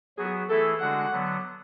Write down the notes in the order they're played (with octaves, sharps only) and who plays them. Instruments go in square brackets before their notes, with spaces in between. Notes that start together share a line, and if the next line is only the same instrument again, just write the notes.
[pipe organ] F#3 B3 F#4 [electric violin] G#4
[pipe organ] E3 A3 E4 G#4 [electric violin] A4
[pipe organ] D3 G#3 D4 F#4 [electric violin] F#5
[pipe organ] D3 F#3 B3